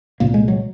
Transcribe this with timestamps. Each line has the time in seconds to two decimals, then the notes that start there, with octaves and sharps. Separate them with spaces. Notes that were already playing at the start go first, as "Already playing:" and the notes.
0.20 C2 A#2 A#3
0.34 G#3
0.48 F#3